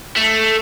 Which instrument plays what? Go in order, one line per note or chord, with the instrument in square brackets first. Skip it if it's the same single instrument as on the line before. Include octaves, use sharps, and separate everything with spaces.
[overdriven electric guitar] A3